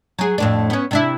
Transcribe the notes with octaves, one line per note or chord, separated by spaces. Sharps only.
F#3 G#4
F2 A2 D4
B3 C#4
C3 D4 E4